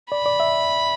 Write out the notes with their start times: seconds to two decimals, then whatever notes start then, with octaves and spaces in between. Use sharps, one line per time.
0.11 D5 B5
0.26 D5
0.40 E5